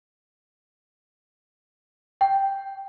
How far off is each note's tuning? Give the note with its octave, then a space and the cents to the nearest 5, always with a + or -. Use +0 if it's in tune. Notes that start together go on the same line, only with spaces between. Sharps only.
G5 +0